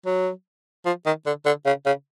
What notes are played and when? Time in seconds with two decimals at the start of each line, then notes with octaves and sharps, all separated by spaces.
0.06 F#3
0.86 F3
1.06 D#3
1.26 D3
1.46 D3
1.66 C#3
1.86 C#3